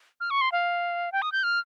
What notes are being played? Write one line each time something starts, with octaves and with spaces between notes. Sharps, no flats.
F6
C#6
C6
F5
G5
D#6
G6
F6